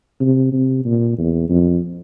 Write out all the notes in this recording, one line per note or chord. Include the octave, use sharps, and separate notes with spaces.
C3
C3
A#2
E2
F2